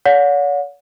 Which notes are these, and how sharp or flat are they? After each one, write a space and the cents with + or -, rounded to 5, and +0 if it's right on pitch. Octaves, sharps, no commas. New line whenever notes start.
C#5 +45 F#5 -40